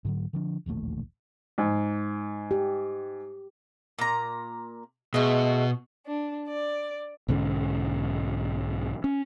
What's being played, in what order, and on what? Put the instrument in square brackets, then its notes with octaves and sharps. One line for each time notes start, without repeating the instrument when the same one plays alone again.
[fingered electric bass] G#2 D3 F#3
D3 F3 D4
E1 A#1 D#2 A3
[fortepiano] G#2
[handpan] G4
[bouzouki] A#2 A#5
[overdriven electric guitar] B2 [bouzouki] G#3 A3
[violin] D4
D5
[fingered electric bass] B1 G#2 D3 C#4
C#4